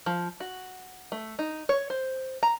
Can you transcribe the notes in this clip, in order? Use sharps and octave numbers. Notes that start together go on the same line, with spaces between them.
F3
F#4
A3
D#4
C#5
C5
A#5